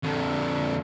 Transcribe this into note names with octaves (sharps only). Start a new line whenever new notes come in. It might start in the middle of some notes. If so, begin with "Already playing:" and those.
F2 D3